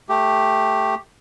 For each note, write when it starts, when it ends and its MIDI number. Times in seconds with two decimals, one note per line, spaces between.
0.09 0.95 57
0.09 0.95 67